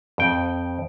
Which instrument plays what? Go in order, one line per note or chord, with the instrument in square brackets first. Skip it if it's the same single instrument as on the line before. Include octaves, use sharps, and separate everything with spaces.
[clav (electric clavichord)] F2 G5